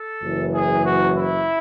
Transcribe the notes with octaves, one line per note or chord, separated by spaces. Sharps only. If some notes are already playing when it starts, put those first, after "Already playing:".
Already playing: A4
F#1 F#2 E3
G#4
F#4
E4